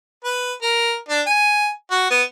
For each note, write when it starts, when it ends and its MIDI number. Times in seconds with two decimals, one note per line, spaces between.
0.24 0.53 71
0.62 0.95 70
1.09 1.22 62
1.27 1.70 80
1.91 2.07 66
2.10 2.23 59